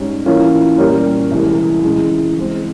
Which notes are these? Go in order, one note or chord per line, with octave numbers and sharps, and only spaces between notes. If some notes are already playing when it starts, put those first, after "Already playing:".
Already playing: G#2 G3 C#4
E3 A#3 C#4 F4
A#2 G3 C#4 G4 A#4
C2 C3 E3 G#3
C#2 C#3 E3 G#3
E3 G#3 C4